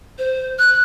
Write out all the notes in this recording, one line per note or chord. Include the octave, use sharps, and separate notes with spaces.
C5
F#6